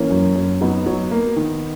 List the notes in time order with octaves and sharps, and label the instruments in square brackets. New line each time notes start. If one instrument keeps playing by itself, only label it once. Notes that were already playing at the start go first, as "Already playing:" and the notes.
Already playing: [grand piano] E3 [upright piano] A#3 C#4
[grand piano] F#2
F#2
[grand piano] F#3 [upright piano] B3 D#4
[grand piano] F#3
A#3
D#3